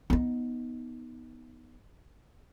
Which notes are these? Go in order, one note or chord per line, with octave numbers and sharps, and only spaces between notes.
B3 D#4